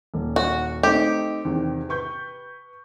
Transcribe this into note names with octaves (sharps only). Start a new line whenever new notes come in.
D#1
F#4
A3 C4 D#4 G4
E2 C3 D#3
B4 C#6 G6